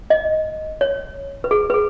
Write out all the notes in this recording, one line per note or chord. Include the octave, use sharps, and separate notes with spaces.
D#5
C#5
B4
G#4
B4
G#4